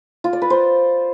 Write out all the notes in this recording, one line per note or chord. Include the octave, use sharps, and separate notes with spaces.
F4
D5
B4
C5